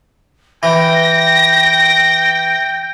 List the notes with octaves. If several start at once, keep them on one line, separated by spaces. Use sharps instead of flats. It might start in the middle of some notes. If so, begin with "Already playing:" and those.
E3 G5 A#6